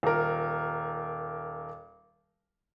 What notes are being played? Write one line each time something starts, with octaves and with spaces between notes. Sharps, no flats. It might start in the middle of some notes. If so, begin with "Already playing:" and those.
D#1 A#4